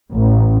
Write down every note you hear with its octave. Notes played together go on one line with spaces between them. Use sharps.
A1